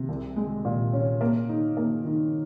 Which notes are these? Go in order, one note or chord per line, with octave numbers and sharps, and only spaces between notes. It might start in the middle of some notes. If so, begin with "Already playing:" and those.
Already playing: C3
C2
G#3
A#2
C#4
A#3
D#4
A#3
D#3